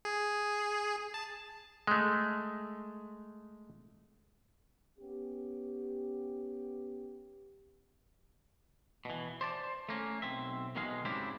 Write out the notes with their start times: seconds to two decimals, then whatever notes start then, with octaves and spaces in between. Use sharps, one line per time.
0.05 G#4
1.14 A5
1.87 G#3 A3
4.98 B3 C#4 G4
9.05 B2 E3
9.41 C5 D5 A5
9.89 A3 A#3 C#4
10.22 B1 C4 E5
10.76 B1 B2 D#3 G#3 F5
11.05 G#2 C#3 C4 D4 E4 G4